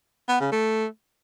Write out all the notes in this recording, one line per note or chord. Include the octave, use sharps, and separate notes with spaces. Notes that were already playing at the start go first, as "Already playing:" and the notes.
B3
C#3
A3